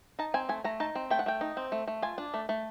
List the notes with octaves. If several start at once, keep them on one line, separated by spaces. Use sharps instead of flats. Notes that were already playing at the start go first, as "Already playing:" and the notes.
D#4 A5
C4 G#5
A3 G#5
A3 A#5
D#4 A5
C4
A3 G5
F#5
A3 G5
D#4
C4
A3
A3
F4 G#5
D4
A3
A3